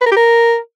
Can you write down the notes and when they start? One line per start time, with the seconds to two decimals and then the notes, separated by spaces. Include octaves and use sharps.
0.01 B4
0.06 A#4
0.11 G4
0.17 A#4